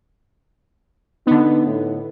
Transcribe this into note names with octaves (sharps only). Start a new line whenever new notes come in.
D3 B3 D#4
A2